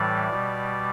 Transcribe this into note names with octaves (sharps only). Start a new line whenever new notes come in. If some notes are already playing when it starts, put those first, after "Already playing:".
Already playing: A2 E3 G3 D5
B2 G3